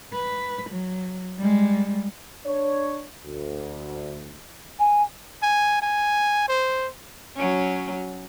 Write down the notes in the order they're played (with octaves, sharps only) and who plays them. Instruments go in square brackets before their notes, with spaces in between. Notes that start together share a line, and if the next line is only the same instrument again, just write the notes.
[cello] B4
F#3
G3 G#3
[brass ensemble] D4 C#5
D2
[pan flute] G#5
[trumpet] G#5
G#5
C5
[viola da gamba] F#3 C#4